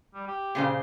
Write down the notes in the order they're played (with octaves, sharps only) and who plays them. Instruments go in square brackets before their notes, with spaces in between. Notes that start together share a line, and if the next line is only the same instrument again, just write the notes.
[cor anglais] G3
G4
[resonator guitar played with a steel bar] A#2 C#3 C5